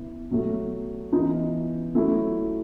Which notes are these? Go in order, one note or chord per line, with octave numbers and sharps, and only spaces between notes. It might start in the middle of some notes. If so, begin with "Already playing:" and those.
Already playing: C#3 B3 E4
B2 F#3 A3
E3 B3 D#4
F#3 A3 E4